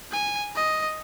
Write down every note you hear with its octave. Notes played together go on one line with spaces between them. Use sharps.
G#5
D#5